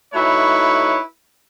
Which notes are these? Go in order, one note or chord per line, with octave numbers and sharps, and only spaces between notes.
A3 D#4 E4 F#4 B4 C#5